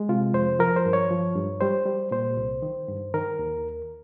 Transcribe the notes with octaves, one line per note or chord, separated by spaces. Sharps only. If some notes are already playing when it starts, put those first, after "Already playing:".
Already playing: G#3
C3 F4
F2 C5
F3 A#4
C5
G2
C#5
F3
G2
G3 C5
G3
A#2 C5
C2
D#3
G2
D#3 A#4
D#2